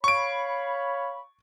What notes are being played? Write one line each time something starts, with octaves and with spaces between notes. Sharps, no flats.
C#5 F5 B5 C#6 D7